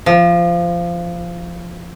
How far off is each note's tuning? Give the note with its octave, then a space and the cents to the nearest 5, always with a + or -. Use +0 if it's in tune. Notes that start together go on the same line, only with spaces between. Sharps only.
F3 -15